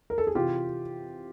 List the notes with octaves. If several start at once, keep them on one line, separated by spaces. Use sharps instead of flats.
A#4
A4
G#4
C3 E3 F4 G4